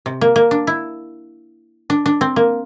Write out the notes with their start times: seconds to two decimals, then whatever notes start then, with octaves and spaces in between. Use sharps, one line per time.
0.06 C3
0.21 A#3
0.36 A#3
0.51 D4
0.67 E4
1.90 D4
2.06 D4
2.21 C4
2.36 A#3